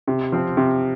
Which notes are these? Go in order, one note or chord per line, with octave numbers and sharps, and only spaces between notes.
C3
F3 C4
C3